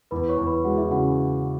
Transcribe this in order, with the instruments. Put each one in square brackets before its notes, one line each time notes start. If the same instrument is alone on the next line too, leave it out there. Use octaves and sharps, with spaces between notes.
[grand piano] E2 [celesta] B4 B5
[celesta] C#5 C#6
[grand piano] E2
[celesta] B4 B5
[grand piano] G#3 [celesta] F#4 F#5
[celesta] E4 E5
[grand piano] C#3 [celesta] F#4 F#5